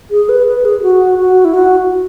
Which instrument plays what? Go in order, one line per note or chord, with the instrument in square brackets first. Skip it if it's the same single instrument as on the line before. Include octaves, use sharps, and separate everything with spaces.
[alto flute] G#4
B4
B4
G#4
F#4
F#4
E4
F#4